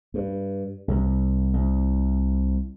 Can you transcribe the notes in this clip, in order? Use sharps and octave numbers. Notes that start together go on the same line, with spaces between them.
G2
C2
C2